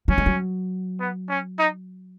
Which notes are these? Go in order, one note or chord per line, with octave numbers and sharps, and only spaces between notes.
F#3 C#4
G#3
F#3
B3
C#4
D#4